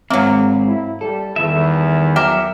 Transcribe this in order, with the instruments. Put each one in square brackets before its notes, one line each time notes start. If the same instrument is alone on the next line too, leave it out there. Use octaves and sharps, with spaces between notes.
[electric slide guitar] G#2 C4 [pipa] F#3 A#3
[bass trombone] E4
[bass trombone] G3 [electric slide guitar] A4
[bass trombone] E2 [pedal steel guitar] D#3 G3 E5
[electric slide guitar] F#3 [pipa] G4 A#4 [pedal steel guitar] E5